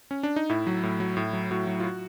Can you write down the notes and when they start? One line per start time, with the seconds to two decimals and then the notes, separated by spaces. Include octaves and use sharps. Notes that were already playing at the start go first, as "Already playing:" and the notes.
0.11 C#4
0.23 D4
0.36 D#4
0.49 A2 E4
0.67 F#3
0.83 A2
1.00 F#3
1.17 A2
1.33 F#3
1.51 A2 F#4
1.67 F#3
1.80 F4
1.84 F#4